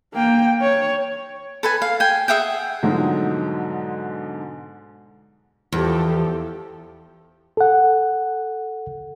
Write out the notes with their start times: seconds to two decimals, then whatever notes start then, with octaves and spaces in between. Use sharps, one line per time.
0.13 A#3 G5
0.62 C#5
1.63 A4 B4 G#5
1.82 F5
2.00 G5 G#5
2.28 G#4 E5 F#5 G5
2.83 G#2 B2 D3 F3 F#3 G#3
5.72 E2 F3 G4 A4
7.57 A4 F#5